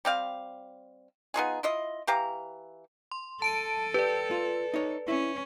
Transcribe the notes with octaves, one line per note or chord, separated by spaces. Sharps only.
G3 C4 F5
B3 D#4 F4 G#4
E4 F4 D#5
E3 G4 F5 A#5
C6
A4 A5 D7 D#7
G4 B4 D5
F4
D#4 C#5
C#4 E4